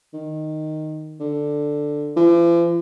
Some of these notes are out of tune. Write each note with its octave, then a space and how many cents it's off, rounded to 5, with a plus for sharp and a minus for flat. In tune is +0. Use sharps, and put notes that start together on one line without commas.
D#3 -5
D3 +5
F3 -45